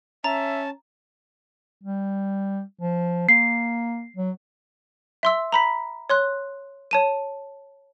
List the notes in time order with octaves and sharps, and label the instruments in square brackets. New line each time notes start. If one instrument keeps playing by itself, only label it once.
[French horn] C#4 [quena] E5 [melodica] A5 [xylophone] A#5
[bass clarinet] G3
F3
[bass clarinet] A#3 [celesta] C7
[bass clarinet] F#3
[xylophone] E5 C6 E6
A#5 B5 B6
C#5 C6 F#6
C#5 A5 D#7